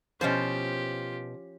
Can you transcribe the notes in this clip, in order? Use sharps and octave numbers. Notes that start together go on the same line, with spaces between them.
B2 F3 C#4 E4 F4 G4 C5